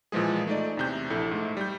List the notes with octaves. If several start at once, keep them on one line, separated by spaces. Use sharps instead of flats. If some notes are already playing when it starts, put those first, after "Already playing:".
A#2 E3 F3 G#3 G#4
A3 D#4 D5
E2 C3 G6
A#1 E4 A4
G#2 A3
G3 G6